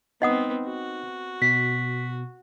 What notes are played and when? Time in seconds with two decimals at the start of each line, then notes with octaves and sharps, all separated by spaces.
0.22 B3 C4 D#4 D#5 F#5 D#6
0.66 F#4
1.42 B2 B6